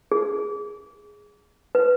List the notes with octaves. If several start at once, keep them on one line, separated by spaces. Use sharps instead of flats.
G#4
B4